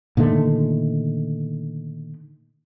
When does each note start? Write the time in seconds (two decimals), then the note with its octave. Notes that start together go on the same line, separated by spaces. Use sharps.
0.17 A#2 D3 D#3 A3